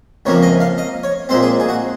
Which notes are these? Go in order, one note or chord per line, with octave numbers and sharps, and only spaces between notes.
C#2 C3 F3 A#3 C#5
D#5
F5
D#5
C#5
A#2 G#3 C4 C5
G#4
G#4
F#4